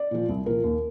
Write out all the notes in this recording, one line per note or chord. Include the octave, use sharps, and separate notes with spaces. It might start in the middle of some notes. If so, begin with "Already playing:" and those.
Already playing: D5
A#2 F3
C2
A#2 F3 A#4
D#2